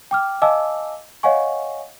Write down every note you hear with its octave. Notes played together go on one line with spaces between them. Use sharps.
G5 D6 F6
D#5 F5 G#5 A5 D6 E6
C#5 D#5 F5 F#5 G#5 C#6